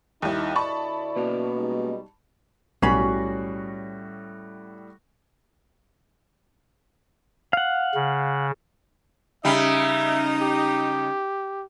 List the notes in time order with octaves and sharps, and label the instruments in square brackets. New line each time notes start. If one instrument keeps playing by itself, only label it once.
[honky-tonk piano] D#2 G3 [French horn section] D#4 E4 [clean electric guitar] D#5
[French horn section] D2 E4 D5 [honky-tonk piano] A5 B5 C#6
[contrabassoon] B2 [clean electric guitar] A#3 C#4 F5
[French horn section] G3 G#3 D#4
[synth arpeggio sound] B1 [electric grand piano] A2 G3 C7 [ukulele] C#4 B5 [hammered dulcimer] F#4
[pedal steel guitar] F5 F#5
[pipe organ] C#3
[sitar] C#3 G3 [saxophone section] D#4 [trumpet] E5
[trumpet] G4